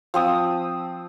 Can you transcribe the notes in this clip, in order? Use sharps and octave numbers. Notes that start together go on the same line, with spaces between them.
F3 C4 D#6